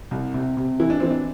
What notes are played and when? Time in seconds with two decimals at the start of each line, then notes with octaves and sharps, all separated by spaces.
0.11 C2
0.34 C3
0.57 C3
0.80 E3 E4
0.90 D4
1.00 E3 C4
1.10 D4